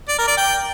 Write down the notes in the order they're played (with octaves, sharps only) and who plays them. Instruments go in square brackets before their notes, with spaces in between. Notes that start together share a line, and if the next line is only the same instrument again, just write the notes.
[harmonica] D5
A#4
D5
G5